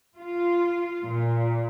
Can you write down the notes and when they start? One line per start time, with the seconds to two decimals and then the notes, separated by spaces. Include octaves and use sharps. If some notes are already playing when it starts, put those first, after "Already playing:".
0.17 F4
1.05 A#2